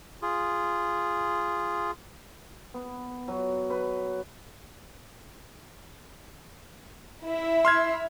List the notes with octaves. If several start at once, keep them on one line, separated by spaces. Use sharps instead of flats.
F4 G#4
B3
F#3
B4
E4 E5
C6 F6 G#6